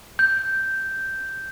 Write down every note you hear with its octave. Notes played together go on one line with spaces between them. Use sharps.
G6